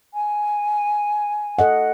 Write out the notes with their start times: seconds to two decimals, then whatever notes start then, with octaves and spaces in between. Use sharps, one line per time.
0.14 G#5
1.59 A4 D#5 F#5